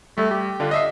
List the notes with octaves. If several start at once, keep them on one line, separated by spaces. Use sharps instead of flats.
G3 A3
G4
D3 D4 F4
D#5 E5 C7